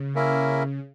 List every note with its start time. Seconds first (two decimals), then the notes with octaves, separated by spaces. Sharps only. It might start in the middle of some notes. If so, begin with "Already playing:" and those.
Already playing: C#3
0.15 A#3 C#4 E4 A#4 E5